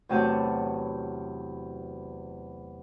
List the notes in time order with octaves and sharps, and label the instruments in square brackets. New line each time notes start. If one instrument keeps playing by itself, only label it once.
[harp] E2 A2 C3 F#3 A5 G6